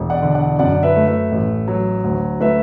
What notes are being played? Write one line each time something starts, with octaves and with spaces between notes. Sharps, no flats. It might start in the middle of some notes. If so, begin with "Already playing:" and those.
Already playing: E1
D5 F#5
D3
D5 F#5
F#2 D5 F#5
B4 E5
A3
B4 E5
A1
F#3
D2
A3 B4 E5